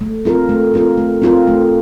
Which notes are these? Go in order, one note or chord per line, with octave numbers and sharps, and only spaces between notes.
A3
C4 F4 A#4
A3
C4 F4 A#4
A3
C4 F4 A#4
A3